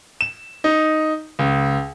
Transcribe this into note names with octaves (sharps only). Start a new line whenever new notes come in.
E7
D#4
C#2